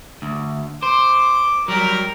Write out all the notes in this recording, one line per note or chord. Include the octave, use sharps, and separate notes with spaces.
D2
C5 D6
F#3 G3 A#4